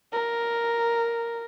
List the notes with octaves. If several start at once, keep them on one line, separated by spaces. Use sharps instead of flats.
A#4